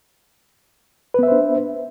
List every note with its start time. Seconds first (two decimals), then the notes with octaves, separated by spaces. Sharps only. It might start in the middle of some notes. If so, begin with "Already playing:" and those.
1.14 B4
1.19 B3
1.23 E5
1.27 C5
1.32 D4